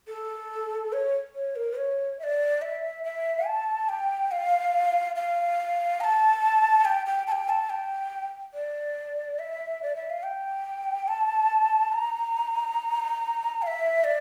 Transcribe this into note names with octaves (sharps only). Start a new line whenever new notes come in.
A4
C#5
C#5
A#4
C#5
E5
D5
E5
E5
A5
G5
F5
F5
A#5
A5
G5
G5
A5
G5
A5
G5
D5
E5
D5
E5
F5
G5
A5
A#5
F5
E5
D5